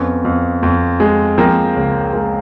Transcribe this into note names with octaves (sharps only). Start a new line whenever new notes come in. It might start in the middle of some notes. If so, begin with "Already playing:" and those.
Already playing: F2 B3 C#4
F2
F2
G#3
F3 A#3 C4
C#2
G#3 A#3